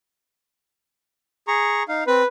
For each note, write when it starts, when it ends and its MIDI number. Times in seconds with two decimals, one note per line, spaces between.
1.48 1.83 68
1.48 1.83 82
1.48 1.83 85
1.88 2.04 63
1.88 2.04 77
2.07 2.22 60
2.07 2.27 71